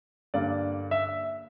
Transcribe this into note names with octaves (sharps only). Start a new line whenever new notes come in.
G2 D3 A#3 D5
E5